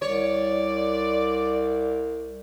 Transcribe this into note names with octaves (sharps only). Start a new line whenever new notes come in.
C2 C#5 D5